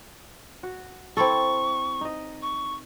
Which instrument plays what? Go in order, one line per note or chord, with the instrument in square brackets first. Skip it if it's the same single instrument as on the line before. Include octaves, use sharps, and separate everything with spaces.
[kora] F#4
[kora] C4 E4 A4 [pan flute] C#6
[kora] D#4 D#5
[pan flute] C#6